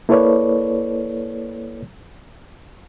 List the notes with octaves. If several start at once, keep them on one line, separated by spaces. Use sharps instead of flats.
A#3 E4 A4 B4 C#5 D5